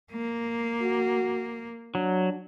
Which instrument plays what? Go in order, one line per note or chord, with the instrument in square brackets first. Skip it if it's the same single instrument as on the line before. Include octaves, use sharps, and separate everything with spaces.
[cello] A#3
[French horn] F#4
[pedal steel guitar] F#3 [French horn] D4